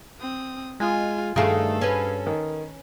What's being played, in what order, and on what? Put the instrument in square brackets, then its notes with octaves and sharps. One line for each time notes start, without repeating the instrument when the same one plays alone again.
[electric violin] C4 D#6
[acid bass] G#3 [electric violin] F4 G#5
[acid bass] G2 [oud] D#3 A3 [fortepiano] G#4 F5 [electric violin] A4
[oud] C#4 B4
[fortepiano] D#3